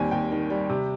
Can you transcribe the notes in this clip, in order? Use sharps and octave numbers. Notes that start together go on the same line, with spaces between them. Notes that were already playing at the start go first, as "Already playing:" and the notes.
Already playing: D#2 G3 C4 G#5
D#2 G5
D#3
G3
C3